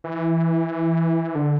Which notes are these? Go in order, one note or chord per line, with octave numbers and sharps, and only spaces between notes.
E3
D3